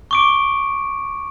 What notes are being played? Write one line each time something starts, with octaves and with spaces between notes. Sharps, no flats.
C#6 D6 D7